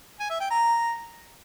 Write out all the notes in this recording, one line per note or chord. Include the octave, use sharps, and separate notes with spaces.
G#5
E5
G5
A#5